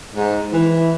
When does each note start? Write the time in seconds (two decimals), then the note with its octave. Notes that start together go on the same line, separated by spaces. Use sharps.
0.15 G#2
0.53 E3